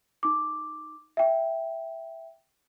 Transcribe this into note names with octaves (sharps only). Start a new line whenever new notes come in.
D#4 D6
E5 G5